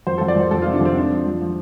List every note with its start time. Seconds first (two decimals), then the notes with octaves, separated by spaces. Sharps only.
0.07 F2 C5
0.18 F2 A4
0.28 D5
0.36 F2 C5
0.51 F2 A4
0.62 C3 F4
0.73 D4
0.81 F2 C4
0.96 F3 D4
1.11 F3
1.26 F3
1.41 F3